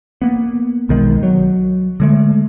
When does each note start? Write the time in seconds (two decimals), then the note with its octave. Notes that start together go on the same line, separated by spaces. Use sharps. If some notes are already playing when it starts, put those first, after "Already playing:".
0.22 A#3 B3
0.89 B1 D#3 G#3
1.23 F#3
2.00 D3 G#3 A3